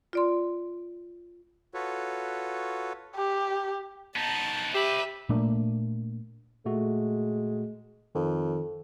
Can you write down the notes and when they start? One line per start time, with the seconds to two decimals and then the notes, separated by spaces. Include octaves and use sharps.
0.13 F4 D5 C6
1.74 F4 F#4 A4 B4 C#5
3.16 G4
4.16 B3 D#4 A5
4.75 G4 C5 E5 B5
5.29 A#2 A3 A#3 D4
6.65 A#2 G#3 A3 F#4
8.15 F2 D#3